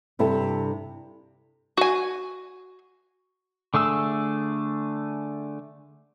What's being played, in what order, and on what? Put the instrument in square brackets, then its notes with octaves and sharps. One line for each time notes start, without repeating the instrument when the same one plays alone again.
[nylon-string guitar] G2 C3 E4 A4 A5
[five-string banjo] F#4 G#5
[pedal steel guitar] D3 A3 G#4 E6